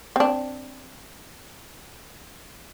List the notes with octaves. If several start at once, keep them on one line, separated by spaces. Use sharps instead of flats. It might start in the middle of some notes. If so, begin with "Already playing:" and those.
C4 D4